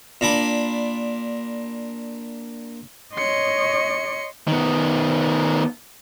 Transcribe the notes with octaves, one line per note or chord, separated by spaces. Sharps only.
A#2 D4 B5
C#5 D#5 C6 C#7
D#3 B3